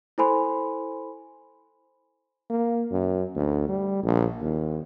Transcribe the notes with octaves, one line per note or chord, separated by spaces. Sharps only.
E4 A4 C5 G#5 B5 C6
A#3
F#2
D2
G3
A#1
D#2